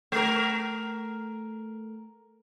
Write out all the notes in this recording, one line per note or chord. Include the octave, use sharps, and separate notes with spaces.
A3 A#4